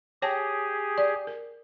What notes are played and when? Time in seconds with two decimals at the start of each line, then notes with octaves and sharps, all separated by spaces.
0.22 G4 G#4 C#5 G5 A5
0.98 D5
1.27 A#4